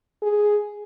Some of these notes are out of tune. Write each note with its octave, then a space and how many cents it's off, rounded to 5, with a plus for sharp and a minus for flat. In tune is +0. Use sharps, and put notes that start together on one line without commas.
G#4 +0